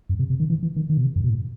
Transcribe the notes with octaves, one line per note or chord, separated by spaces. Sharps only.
F#2
C3
C3
D#3
E3
E3
D#3
D#3
B2
C3
F#2
B2
A2